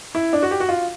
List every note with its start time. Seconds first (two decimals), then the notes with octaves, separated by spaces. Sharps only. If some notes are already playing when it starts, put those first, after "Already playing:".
0.15 E4
0.33 D4
0.42 F#4
0.51 G4
0.60 F#4
0.69 F4